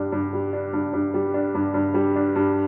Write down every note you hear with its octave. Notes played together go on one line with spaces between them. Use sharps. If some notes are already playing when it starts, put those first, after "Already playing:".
Already playing: G2 G3 D4
G2
G3
D4
G2
G2
G3
D4
G2
G2
G3
D4
G2